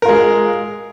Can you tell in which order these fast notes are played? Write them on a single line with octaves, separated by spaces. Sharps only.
A#4 F4 G#3